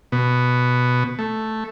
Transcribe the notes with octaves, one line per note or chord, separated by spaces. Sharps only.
B2
A3